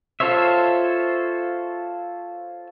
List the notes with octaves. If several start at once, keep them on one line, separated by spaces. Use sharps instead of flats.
F4 A4 C5 C#5 E5